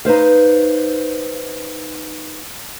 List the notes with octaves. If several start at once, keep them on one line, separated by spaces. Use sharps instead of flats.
D#4 B4 C5 F5